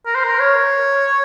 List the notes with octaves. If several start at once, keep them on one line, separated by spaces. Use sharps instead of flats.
A#4
C5
A#4
C#5